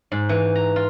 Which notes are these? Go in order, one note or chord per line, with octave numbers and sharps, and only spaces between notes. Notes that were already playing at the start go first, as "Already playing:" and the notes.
G#2
E3
A#5
F4